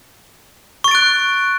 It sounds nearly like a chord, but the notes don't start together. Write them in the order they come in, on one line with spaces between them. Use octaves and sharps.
C#6 A6 D7 F#6